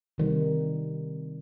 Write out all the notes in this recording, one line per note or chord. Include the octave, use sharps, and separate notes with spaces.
C3 D#3 G3